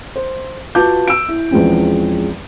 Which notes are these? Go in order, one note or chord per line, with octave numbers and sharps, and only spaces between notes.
C5
F4 F#4 B4 A5 D6 G6
E6 D7
E4
E2 F3 G#3 C4 C#4